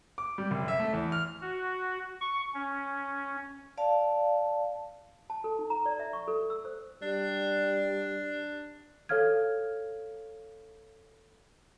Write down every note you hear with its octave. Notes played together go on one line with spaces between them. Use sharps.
D6
G3
F#1
E5
A3
E2
F6
F#4
C#6
C#4
D5 F5 A5
A5
A4
D#4
A#5
D5
E5
C#6
A4
E6
C5
G3 D4
A4 C#5 F5 F6 G#6